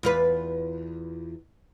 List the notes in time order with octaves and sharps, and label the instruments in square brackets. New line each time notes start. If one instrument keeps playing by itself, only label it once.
[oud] E2 F4 B4